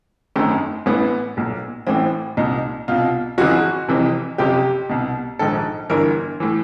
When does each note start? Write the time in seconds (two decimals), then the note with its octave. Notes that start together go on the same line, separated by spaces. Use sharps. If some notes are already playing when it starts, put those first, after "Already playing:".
0.36 G#1 F#2 D#3 A3
0.86 A1 A2 E3 B3
1.37 B1 A#2
1.87 A1 A2 E3 C4
2.37 C2 A#2 D#4
2.88 C2 B2 F4
3.38 F#1 F2 C#3 E3 F#4
3.88 F1 F2 C3 E3
4.38 F#1 F2 C3 G4
4.89 C2 B2
5.39 A#1 G#2 D#3 A4
5.90 G1 G2 E3 A#4
6.40 A2 E3